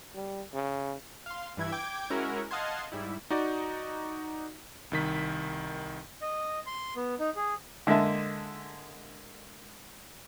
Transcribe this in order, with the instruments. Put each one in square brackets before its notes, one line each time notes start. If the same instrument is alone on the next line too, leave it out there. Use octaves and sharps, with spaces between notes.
[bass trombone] G3
C#3
[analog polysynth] F5 C6
G2 E3 E4 G#6
G5 D6 G#6 D7
G#3 C#4 E4 F#4 A#4
D#5 F5 F#5 A5 C6 G#6
G#2 G3 E4
[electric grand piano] D#4 F#4 D5 D#5
C2 D#3 B6
[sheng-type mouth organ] D#5
C6
B3
D#4
G#4
[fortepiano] D3 G#3 A#3 E5 A5